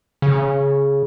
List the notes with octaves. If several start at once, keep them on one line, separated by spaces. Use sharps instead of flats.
C#3